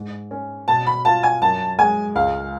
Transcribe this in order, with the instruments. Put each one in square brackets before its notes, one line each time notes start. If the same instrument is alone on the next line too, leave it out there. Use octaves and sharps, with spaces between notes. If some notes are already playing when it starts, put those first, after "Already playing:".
Already playing: [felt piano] G#2
C#4
[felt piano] B2 [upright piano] A5
[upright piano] B5
[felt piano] F4 [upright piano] A5
[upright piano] G#5
[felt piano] F#2 [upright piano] A5
[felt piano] G#3 [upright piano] G#5
[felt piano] C#2 [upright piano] F5